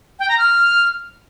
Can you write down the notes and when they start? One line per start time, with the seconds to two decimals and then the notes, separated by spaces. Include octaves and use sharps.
0.19 G5
0.29 A#5
0.38 F6